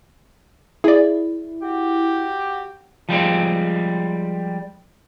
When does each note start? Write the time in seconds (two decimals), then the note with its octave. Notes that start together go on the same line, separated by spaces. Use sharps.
0.84 E4 G#4 D5
1.62 F#4 G4
3.09 F3 G3 G#3 C4